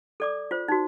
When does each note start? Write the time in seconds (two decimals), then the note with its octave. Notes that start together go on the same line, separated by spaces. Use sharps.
0.20 A4 D5 D6
0.51 F4 C5
0.68 D#4 F#4